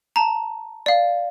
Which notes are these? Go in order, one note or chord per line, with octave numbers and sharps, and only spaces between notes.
A5 A#5
D5 F5